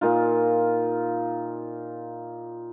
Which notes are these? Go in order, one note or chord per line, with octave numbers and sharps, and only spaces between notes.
A#2 D#4 F4